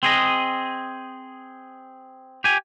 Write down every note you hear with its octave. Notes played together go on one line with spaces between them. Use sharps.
C4 G#4 D#5
G4 G#5